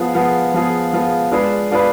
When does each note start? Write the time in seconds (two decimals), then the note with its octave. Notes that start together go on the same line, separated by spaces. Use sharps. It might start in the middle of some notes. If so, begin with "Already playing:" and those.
Already playing: F3 B3 F4 G#4
0.14 F3 B3 F4 G#4
0.54 F3 B3 F4 G#4
0.93 F3 B3 F4 G#4
1.31 G#3 D4 F4 G#4 B4
1.71 G#3 D4 F4 G#4 B4